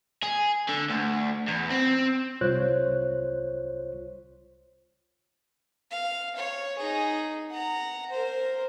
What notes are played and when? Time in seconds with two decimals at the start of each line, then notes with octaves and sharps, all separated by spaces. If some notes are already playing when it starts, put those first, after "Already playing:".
0.23 G#4
0.69 D3
0.89 D2
1.48 E2
1.70 C4
2.41 C2 F4 C5 C#5 F#6
5.91 F5
6.36 C#5
6.78 D#4 G#4
7.50 F#5 A#5
8.10 A#4 C5